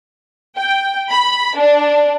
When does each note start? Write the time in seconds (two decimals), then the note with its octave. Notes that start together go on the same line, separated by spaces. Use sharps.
0.57 G5
1.10 B5
1.57 D4